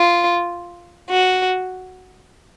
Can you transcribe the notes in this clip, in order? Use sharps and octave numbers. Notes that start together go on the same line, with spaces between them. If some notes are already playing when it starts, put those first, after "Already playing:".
Already playing: F4
F#4